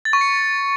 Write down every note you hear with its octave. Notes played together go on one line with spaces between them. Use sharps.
A6
C#6
C#7